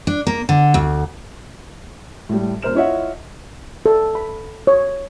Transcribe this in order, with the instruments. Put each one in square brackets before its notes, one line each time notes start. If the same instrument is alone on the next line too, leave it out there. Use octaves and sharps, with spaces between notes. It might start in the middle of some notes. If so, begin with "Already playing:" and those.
[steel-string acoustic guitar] D4
A#3
D3
D2
[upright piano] A2 G3
E1 A#4 C5 F6 E7
E4 F4 C#5 D#5 E5 F#5
[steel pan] A4
B5
C#5